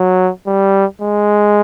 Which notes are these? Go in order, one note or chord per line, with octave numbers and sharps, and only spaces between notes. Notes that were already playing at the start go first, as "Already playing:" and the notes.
Already playing: F#3
G3
G#3